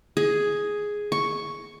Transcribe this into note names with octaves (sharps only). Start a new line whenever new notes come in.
G#4
C#6